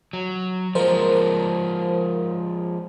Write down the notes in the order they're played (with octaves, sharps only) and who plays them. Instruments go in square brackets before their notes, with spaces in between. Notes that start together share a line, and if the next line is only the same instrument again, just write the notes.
[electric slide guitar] F#3
[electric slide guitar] F3 G#3 [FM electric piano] A#4 C5